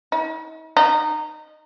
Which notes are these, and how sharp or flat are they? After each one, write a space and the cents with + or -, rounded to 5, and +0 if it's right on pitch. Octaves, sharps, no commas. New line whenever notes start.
D#4 +45
D#4 -20